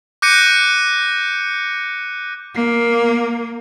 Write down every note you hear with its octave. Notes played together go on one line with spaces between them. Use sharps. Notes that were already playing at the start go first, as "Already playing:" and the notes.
D6 F#6 G6 A#6 C#7 D#7
A#3